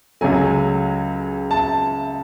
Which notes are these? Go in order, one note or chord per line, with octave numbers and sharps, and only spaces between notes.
C#2 C#3 F#3 A3 G#5
A5